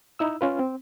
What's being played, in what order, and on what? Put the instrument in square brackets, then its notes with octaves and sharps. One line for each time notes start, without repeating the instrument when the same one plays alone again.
[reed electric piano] D#4 E4 E6
C#4 F4 B4
C4